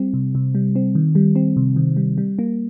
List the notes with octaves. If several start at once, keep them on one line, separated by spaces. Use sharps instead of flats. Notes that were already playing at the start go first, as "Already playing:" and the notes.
Already playing: G3 C4
C3
C3
G3
C4
D#3
G3
C4
C3
D#3
G3
G3
A#3